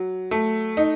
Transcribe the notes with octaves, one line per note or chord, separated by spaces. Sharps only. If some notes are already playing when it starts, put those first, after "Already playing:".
Already playing: F#3
A3
D#4